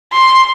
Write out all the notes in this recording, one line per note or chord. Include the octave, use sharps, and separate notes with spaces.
C6